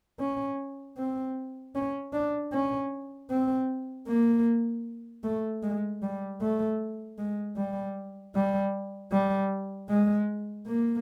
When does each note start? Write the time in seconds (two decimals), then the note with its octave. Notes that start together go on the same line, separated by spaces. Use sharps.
0.20 C#4
0.98 C4
1.75 C#4
2.13 D4
2.53 C#4
3.30 C4
4.08 A#3
5.24 A3
5.63 G#3
6.03 G3
6.41 A3
7.18 G#3
7.57 G3
8.35 G3
9.12 G3
9.89 G#3
10.68 A#3